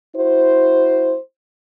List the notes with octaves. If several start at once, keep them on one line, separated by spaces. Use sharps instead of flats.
E4 F#4 C5